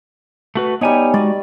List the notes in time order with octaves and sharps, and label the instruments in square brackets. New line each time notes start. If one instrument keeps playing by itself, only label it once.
[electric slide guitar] A3 F#4 B4
[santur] G3 D#4 [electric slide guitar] B3 C#5 G#5
[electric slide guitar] G#3 F#4 [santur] D5